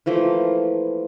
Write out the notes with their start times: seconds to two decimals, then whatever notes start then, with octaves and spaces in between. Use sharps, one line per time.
0.06 E3 F3 A3 A#3